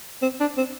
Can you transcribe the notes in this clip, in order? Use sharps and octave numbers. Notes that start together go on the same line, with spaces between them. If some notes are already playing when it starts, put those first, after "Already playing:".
C4
D4
C4